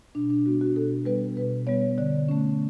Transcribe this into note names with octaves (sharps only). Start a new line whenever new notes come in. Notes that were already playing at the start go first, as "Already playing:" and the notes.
B2 D4
D4
G3 B3 F#4
F#4
B2 A4
G3 B3 B4
B2 B4
G3 B3 C#5
D3 D5
A3 C#4